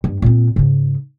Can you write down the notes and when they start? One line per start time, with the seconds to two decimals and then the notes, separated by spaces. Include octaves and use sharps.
0.04 G2
0.22 A#2 C4
0.56 G#2 C#3